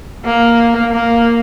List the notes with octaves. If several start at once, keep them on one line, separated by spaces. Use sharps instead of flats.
A#3
A#3